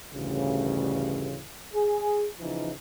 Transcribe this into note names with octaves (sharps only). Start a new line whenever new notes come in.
A1 D2 G2 C#3
G#4
C#3 E3 F3 D#4